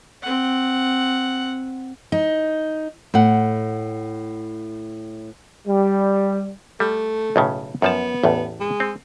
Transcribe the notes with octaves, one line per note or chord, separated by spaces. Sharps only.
C4 F#5
D#4
A2 F#5
G3
G3 A3
B1 A2 C#3
F#2 F3 B3 A5
A1 E2 A2
G#3
C4